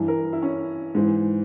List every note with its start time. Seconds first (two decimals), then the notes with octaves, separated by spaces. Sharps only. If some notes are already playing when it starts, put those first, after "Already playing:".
Already playing: G2 E3
0.08 A#4
0.33 E4
0.42 C#4
0.95 G#2 E3